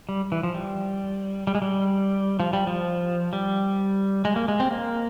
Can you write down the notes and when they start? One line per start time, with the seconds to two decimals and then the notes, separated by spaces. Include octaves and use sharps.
0.09 G3
0.32 E3
0.43 F3
0.54 G3
1.47 G3
1.55 G#3
1.62 G3
2.40 F3
2.53 G3
2.67 F3
3.33 G3
4.25 G#3
4.36 A#3
4.48 G#3
4.60 C4
4.71 A#3